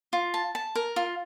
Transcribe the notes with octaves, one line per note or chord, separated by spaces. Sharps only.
F4
A5
A5
A#4
F4